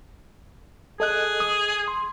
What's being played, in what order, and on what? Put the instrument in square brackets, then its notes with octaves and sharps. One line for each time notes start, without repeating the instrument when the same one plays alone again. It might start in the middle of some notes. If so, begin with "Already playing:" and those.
[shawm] G#4 [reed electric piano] A4 D#5 F#6
[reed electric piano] D#6
C6